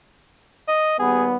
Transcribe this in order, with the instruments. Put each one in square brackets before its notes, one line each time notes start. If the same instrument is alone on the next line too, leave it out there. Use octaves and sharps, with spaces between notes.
[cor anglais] D#5
[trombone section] D#2 G3 B3 [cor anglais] G#4